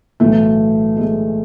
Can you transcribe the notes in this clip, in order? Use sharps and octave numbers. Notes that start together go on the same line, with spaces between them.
B1 A2 E3 A3
G#3
A3